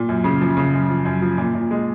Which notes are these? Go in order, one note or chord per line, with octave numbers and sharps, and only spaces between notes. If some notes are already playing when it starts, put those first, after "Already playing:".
Already playing: A#2
F#2
C#3
F3
C#3
F#2
F3
F#2
F3
A#2
A#2
G#3